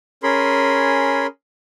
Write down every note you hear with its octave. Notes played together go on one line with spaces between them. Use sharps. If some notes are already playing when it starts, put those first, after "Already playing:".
C#4 G#4 A#4 B5 C6